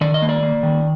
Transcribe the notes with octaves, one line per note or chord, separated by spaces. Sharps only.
D#3 D5
D#5
A#3
D5
A#3
D#3